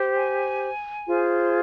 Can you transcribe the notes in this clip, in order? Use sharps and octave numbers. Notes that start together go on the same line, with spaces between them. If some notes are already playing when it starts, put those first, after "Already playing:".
Already playing: G4 C5
G#5
F4 G#4 C5